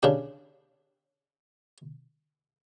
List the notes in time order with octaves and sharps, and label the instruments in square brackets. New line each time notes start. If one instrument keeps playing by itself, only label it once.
[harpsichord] C#3 D4 G4